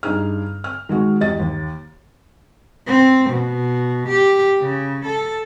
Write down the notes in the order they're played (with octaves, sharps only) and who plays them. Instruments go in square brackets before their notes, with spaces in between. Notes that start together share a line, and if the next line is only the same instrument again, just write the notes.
[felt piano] G2 D#4 G#4 F6
F6
D#3 G#3 F#4
E2 G4 D#5 A6
D#2
[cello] C4
B2
G4
C#3
A4